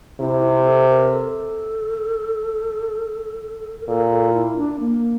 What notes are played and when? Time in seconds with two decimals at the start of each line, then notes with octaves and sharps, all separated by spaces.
0.20 C3 E4
0.43 E4
0.65 A4
0.89 A#4
1.12 A4
3.80 A#4
3.88 A#2 A4
4.10 A4
4.34 E4
4.56 D4
4.80 A#3